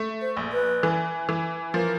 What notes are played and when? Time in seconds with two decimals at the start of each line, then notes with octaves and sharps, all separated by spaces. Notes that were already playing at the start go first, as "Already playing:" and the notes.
Already playing: A3
0.22 C5
0.37 A#1
0.53 B4
0.83 E3
1.29 E3
1.74 F3 A#4